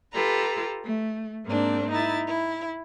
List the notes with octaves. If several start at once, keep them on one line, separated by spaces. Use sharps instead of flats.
F4 G4 A4 B4 A#5
A3
G#2 A#3 C4 D4
D#4 E4 A6
E4